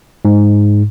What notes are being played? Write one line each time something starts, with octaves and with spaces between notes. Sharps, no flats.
G#2